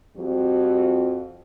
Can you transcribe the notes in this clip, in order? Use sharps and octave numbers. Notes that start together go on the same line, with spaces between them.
F2 F3 G3 C4 F#4